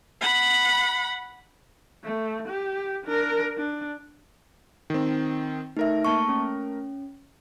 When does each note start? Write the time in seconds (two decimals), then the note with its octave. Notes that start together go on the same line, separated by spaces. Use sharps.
0.21 F#5 B5
2.04 A3
2.48 G4
3.05 D4 A#4
3.57 D4
4.90 D#3 C4
5.77 A3 D#4 A#4 E5
6.05 A#3 A5 C#6
6.29 C#4